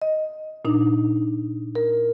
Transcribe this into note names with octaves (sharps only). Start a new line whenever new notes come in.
D#5
A#2 D4 D#4
A#4